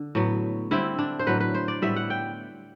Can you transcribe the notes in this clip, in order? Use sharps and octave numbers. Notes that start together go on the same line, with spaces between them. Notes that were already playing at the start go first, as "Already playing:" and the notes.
Already playing: D3
A2 F#3 B3
D3 G3 C4 E4
D4
C5
A2 F#3 B3 B4
B4
C5
D5
A2 G3 B3 E5
F#5
G5